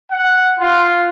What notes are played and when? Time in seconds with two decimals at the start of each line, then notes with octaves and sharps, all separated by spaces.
0.11 F#5
0.59 F4